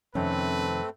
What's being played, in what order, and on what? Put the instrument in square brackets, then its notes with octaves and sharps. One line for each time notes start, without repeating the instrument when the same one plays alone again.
[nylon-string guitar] F2 C3 D#3 [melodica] A3 C4 A4 [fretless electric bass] C#4 [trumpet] B4